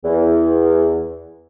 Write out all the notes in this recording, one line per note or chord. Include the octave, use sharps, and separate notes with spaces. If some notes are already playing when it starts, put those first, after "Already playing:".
E2